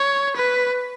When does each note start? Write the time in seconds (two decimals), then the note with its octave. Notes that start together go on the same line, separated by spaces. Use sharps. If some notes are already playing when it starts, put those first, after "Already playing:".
Already playing: C#5
0.36 B4